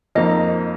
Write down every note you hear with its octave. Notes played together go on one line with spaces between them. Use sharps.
F2 F3 A#3 D#4 D#5